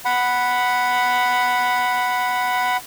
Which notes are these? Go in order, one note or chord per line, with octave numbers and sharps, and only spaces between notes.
F#5 B5